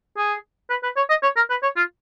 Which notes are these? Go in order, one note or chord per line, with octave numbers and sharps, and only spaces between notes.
G#4
B4
B4
C#5
D#5
C#5
A#4
B4
C#5
F4